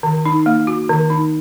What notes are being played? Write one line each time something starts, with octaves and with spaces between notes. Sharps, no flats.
D#3
D#4
A#3
F#4
D#3
D#4